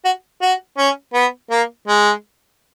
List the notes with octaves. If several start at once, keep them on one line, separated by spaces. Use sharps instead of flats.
F#4
F#4
C#4
B3
A#3
G#3